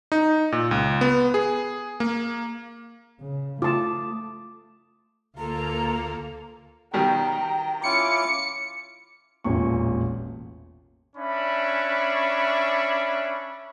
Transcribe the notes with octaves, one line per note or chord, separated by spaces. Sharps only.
D#4
A#2
C#2
B3
G#4
A#3
C#3
A3 F4 A5 D6 D#6
D2 A#3 F4 A4 A#5
B2 D#3 G3 G5 A#5
C#4 E4 F4 D6 C#7
E1 A1 A#2 C#6
C#4 D4 E5 B5 C#6